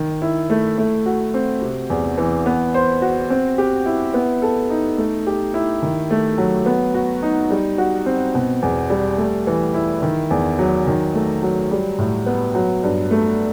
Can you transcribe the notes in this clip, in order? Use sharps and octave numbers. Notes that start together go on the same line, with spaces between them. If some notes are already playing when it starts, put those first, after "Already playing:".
Already playing: D#3
E4
A3
A3
F#4
C4
C3
E2
E3
B3
C5
F#4
C4
G4
E4
B3
A4
D#4
A3
G4
E4
D#3
A3
F#3
B3
F#4
D#4
G3
F#4
C4
B2
E2
G3
A3
E3
E4
D#3
E2
F#3
D#3
A3
F#3
G3
A2
B3
F#3
G2
A3